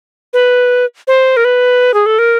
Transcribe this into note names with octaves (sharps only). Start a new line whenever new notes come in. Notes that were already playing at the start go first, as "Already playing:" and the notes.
B4
C5
A#4
B4
G#4
A4
A#4